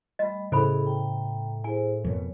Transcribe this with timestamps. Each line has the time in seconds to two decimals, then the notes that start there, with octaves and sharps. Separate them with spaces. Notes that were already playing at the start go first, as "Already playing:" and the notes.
0.19 G3 A3 D#5 B5
0.52 A2 C#3 E4 G#4 A4 C5 B5
0.86 G5 A#5
1.64 E4 G#4 C5 G#5
2.05 F2 B2 A#4 C#5